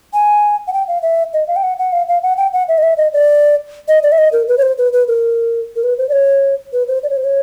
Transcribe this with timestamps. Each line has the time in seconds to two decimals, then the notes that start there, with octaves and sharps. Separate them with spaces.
0.13 G#5
0.67 F#5
0.73 G5
0.88 F5
1.02 E5
1.33 D#5
1.48 F5
1.56 G5
1.63 F#5
1.78 F#5
1.93 F5
2.08 F5
2.23 F#5
2.37 G5
2.53 F#5
2.68 E5
2.78 D#5
2.83 E5
2.97 D#5
3.13 D5
3.88 D#5
4.03 D5
4.12 E5
4.18 D#5
4.32 A#4
4.48 B4
4.58 C#5
4.62 C5
4.78 B4
4.93 B4
5.08 A#4
5.76 A#4
5.83 B4
5.98 C5
6.09 D5
6.12 C#5
6.73 B4
6.88 C5
7.03 D5
7.10 C#5
7.17 C5
7.24 C#5